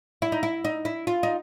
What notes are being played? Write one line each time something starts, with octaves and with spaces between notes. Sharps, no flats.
E4
D#4
E4
D#4
E4
F4
D#4